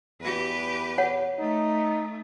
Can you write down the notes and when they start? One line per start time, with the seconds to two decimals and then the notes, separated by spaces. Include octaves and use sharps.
0.20 E2 G4 B4
0.98 C#5 F#5
1.39 A3 D#4